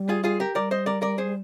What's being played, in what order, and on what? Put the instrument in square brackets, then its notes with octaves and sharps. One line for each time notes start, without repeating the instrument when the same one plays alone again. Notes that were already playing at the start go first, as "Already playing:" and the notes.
Already playing: [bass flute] G3
[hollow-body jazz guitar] F4 G#4
F4 G#4
G4 A#4
[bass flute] G3 [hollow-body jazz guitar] A#4 D5
[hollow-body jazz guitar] C5 D#5
A#4 D5
A#4 D5
G#4 C5